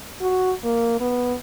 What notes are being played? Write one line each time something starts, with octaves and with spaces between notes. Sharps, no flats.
F#4
A#3
B3